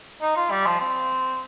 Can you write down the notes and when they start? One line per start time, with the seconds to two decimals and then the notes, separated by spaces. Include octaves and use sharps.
0.22 D#4
0.36 F4
0.51 G3
0.66 F3
0.80 C4